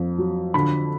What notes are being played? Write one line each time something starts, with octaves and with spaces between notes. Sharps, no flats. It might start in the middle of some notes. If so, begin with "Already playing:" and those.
Already playing: F2
F#3
D3 B5